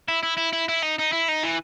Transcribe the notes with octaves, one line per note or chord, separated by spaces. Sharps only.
E4
E4
E4
E4
E4
D#4
D#4
E4
D#4
E3